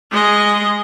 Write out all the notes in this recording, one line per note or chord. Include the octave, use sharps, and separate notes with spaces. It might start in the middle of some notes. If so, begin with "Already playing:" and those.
G#3 D#5